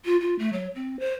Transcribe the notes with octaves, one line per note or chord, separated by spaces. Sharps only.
F4
F4
A3
F#3
C4
C5